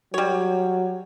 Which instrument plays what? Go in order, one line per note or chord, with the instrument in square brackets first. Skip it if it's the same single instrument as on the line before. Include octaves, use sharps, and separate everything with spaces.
[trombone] F#3 [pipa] G3 C#5